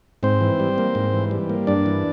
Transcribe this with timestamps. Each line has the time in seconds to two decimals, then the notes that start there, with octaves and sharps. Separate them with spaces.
0.23 G#2 C4 C5
0.41 E3
0.60 G3
0.78 A#3
0.95 G#2
1.13 E3
1.31 G3
1.49 A#3
1.67 G2 D4 D5
1.86 E3